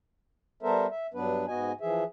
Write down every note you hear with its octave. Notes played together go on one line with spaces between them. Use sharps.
G3 B3 A4 A#4 C5 E5
E5
G2 F#3 B3 D4 B4
G#2 B3 F#4 D#5 G#5
E3 F3 G#4 E5